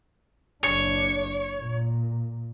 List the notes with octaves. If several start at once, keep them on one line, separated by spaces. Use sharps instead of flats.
F#1 D4 C#5
A#2